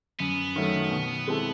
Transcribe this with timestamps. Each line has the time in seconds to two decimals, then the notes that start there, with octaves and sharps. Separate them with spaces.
0.19 F#2 B3
0.56 D#3 F#3 A3 C#4
0.91 B2
1.27 G#3 C4 E4 A4